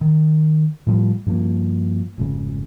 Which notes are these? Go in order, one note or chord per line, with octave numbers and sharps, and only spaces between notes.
D#3
A2 F3 G3
G2 F3 A3 A#3
F1 G#2 C#3